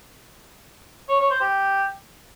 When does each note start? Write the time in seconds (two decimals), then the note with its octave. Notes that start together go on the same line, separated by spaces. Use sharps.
1.09 C#5
1.20 C#5
1.30 C5
1.41 G4